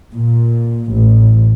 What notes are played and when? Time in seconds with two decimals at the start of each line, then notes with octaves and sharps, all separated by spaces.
0.13 A#2
0.92 A1